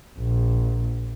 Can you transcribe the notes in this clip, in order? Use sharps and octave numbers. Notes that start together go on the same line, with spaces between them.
A#1